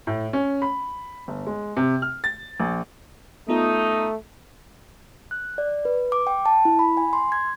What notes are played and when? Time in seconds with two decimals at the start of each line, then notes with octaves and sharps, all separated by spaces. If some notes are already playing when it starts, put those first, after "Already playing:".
0.07 A2
0.33 C#4
0.62 B5
1.28 G1
1.47 G#3
1.77 C3
2.02 F6
2.24 A6
2.60 A#1
3.49 A3 B3 D#4 F4
5.31 F#6
5.58 D5
5.85 B4
6.12 D6
6.27 G5
6.46 A5
6.65 E4
6.79 B5
6.97 G#5
7.13 C6
7.32 G#6